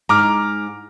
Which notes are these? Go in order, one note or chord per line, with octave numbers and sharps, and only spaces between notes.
G#2 A#5 D6 F6